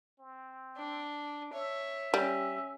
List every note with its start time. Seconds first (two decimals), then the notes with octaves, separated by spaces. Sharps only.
0.19 C4
0.77 D4
1.53 C#5 E5
2.14 G3 C#4